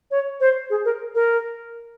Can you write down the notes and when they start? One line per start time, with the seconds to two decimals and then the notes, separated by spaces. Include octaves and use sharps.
0.11 C#5
0.41 C5
0.70 G#4
0.85 A#4
1.15 A#4